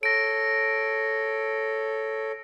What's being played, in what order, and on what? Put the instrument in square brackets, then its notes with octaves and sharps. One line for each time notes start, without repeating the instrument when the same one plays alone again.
[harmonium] A4 C#5 [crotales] A#6 D7